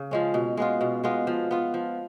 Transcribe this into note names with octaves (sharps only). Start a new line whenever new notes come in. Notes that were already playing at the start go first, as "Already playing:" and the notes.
Already playing: C#3
F3 G#3 C#4
B2
G#3 B3 F4
B2
G#3 B3 F4
F3
B3 F4
F3